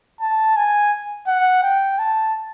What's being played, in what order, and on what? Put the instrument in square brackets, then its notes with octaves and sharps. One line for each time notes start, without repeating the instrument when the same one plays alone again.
[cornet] A5
G#5
F#5
G5
A5